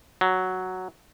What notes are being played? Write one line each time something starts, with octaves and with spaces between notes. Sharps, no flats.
F#3